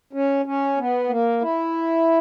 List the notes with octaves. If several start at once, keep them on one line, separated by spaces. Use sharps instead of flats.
C#4
C#4
B3
A#3
E4